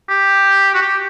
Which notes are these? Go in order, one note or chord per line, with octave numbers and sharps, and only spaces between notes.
G4
F#4
G4